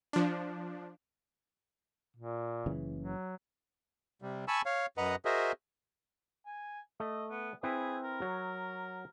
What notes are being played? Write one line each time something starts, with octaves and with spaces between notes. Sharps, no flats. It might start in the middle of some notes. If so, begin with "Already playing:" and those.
F3 D4
A#2
F#1 C#3 E3
F#3
C3 G3
G#5 A5 B5 C#6 E6
C#5 F5
F#2 B4 D#5 F#5 A#5
F#4 G#4 A#4 C5 D#5 E5
G#5
A3 D#5
B3
C4 E4 G#4 B4
A#4
F#3 C#5